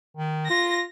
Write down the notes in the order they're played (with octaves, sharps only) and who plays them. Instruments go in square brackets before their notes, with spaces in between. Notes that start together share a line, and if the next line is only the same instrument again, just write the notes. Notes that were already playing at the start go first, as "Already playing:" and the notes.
[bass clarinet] D#3
[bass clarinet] F4 [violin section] A#6